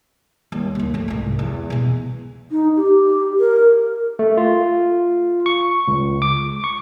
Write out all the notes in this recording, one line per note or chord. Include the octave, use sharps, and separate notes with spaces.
D#2 G3
D1 D3
F2 A3
C2 G#2
E2
B2 E3
D#4
G4
A#4
A3
F4
C#6
C#2
D6
C#6